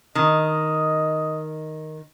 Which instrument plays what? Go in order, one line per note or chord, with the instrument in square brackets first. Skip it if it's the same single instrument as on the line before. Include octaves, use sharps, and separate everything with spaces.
[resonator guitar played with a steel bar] D#3 [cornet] D#5